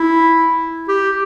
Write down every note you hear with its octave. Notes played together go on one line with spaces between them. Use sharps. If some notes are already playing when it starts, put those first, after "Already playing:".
Already playing: E4
G4